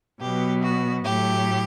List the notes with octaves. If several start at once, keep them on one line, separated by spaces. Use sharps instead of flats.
B2 F#3 B3 G4
F#4
A2 F#3 A3 G4